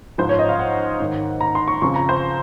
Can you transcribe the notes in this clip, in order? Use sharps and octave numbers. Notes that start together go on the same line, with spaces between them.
G#2 F3 C5
C#5
D#5
F5
F#5
G#2 D#3
A#5
C6
C#6
F2 C#3 F3 C#6
A#5
C5